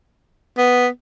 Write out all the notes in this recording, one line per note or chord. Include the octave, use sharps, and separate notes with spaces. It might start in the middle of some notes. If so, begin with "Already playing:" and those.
B3